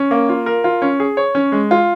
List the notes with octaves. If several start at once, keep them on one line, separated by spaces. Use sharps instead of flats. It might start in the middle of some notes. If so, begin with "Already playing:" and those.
Already playing: C#4
A#3
F4
A#4
F4
C#4
G#4
C#5
C#4
G#3
F4